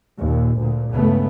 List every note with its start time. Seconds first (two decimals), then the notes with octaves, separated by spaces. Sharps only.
0.17 D#2 A#2
0.59 D2 A#2
0.91 C#2 G2 C#3 A3 B3